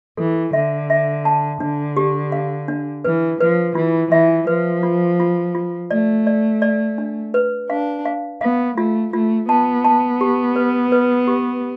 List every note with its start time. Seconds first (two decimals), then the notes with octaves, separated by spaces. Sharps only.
0.17 E3 A4
0.53 D3 E5
0.90 E5
1.25 A5
1.60 D3 D4
1.97 G4
2.32 F5
2.68 D4
3.04 E3 B4
3.40 F3 B4
3.75 E3 F4
4.11 E3 E5
4.47 F3 B4
4.83 F4
5.20 F4
5.55 F4
5.91 A3 D5
6.27 D5
6.62 D5
6.98 D4
7.34 B4
7.70 D4 F5
8.05 F5
8.41 B3 F5
8.77 A3 F4
9.13 A3 F4
9.48 B3 A5
9.84 A5
10.21 G4
10.56 B4
10.92 B4
11.27 G4